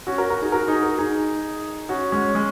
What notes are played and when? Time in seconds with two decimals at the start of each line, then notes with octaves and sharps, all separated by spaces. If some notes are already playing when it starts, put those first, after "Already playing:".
0.07 C#4 F#4
0.18 F#4 A#4
0.30 F#4 A#4
0.42 D#4 G#4
0.52 F#4 A#4
0.68 D#4 G#4
0.83 F#4 A#4
0.98 D#4 G#4
1.89 C#4 F#4
2.12 G#3 C#4
2.35 G#3 C#4